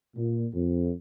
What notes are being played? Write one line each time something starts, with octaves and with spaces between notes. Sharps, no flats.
A#2
F2